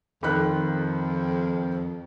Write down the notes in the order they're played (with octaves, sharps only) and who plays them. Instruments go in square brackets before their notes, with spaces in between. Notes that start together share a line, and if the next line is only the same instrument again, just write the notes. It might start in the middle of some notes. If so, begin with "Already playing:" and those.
[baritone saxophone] F2 [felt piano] D#3 B5 F#6